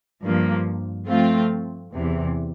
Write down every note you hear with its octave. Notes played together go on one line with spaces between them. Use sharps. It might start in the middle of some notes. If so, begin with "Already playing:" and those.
G2 F3 A#3
F3 A3 C4 F4
E2 C3 E3